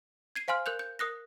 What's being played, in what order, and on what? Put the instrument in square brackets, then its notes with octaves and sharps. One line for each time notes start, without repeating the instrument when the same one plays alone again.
[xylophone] G#6 C7 D#7
C5 F5 G#5 C6 F6
A#4 F#6 G6 F7
G6
A#4 D#6 F#6 A#6